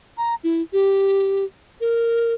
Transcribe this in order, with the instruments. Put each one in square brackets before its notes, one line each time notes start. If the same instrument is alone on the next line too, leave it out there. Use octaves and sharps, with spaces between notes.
[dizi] A#5
E4
G4
A#4